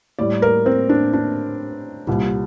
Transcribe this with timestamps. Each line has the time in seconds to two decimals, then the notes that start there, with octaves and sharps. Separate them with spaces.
0.19 A2 G3 D5
0.42 A#4
0.66 C4
0.89 D4
1.14 D4
2.07 C2 A#2 G3